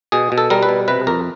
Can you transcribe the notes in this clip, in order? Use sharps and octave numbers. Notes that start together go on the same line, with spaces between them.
B2 G#4
B2
A4
G3 A#4
B4
B2
C3 B4
F2 A#4